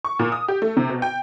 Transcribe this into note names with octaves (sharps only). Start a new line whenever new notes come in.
C#6
A#2
D#6
G4
A3
C3
B2
G5